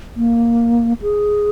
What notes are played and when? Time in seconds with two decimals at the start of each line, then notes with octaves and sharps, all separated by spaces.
0.16 A#3
1.02 G#4